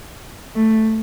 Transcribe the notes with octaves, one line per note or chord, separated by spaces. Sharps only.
A3